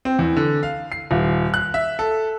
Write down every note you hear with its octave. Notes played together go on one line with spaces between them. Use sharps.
C4
E2
D3
F5
C7
D#1
F#6
E5
A4